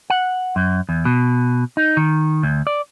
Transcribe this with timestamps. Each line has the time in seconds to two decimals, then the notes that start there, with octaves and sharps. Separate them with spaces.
0.10 F#5
0.56 F#2
0.89 E2
1.05 B2
1.77 D#4
1.97 D#3
2.43 D2
2.67 D5